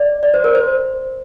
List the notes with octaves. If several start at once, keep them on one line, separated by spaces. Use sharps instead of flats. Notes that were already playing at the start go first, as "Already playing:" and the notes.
Already playing: D5
D5
C5
A#4
C5